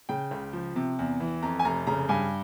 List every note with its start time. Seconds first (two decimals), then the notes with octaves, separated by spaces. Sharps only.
0.09 C#3 G5
0.31 C#2
0.53 F3
0.76 C3
0.99 E2
1.20 E3
1.43 F2 A#5
1.60 G#5
1.65 F1 A#5
1.87 C#3 A#5
2.09 G2 G#5